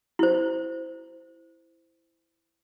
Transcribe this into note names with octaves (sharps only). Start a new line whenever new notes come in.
E4 C5